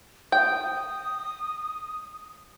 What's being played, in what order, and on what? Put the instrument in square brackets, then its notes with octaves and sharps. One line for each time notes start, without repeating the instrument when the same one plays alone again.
[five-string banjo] G5 [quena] D#6